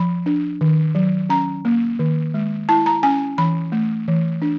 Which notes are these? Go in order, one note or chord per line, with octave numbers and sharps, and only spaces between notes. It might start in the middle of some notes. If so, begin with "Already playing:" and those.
Already playing: F3 B5
D4
D#3
F#3
C#4 A#5
A#3
D#3
G#3
E4 A5
A#5
C#4 G#5
E3 B5
A3
E3
D4